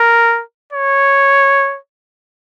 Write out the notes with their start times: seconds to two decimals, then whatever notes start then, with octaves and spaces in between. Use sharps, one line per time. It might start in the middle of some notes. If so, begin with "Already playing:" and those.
Already playing: A#4
0.73 C#5